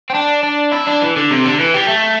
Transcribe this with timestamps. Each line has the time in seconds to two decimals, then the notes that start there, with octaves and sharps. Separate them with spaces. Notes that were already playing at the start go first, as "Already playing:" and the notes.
0.10 C4
0.15 D4
0.44 D4
0.73 E4
0.87 D4
1.02 E3
1.17 D3
1.31 C3
1.45 D3
1.60 E3
1.74 G3
1.89 A3